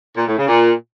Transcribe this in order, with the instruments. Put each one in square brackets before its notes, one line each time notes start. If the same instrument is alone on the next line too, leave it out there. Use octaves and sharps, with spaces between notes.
[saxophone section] A#2
A2
C#3
A#2